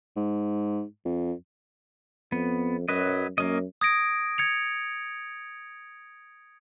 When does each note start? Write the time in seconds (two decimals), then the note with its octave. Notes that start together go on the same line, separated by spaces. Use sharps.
0.17 G#2
1.05 F2
2.32 F2 B3
2.88 F#2 F#3 B4 D#5
3.38 F#2 A#3 C#4 D#5
3.81 D#6 G#6 A#6 D7
4.38 G#6 C#7 F7